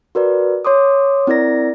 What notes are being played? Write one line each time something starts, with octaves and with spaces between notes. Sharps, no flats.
F#4 A#4 B4 D5
C#5 C6 D6 D#6
C4 E4 A#4 D5 A#6